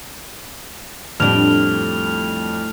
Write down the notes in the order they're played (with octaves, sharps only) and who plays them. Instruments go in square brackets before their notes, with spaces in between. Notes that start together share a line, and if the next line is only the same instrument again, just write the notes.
[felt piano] F2 G3 [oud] A2 D4 [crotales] F6 F7